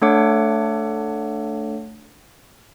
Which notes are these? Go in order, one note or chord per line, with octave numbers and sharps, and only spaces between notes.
A3 D4 A4 C#5 F#5 D6